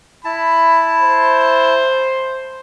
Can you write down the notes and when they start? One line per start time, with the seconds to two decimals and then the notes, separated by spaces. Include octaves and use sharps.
0.25 E4 A5 B5
0.99 C5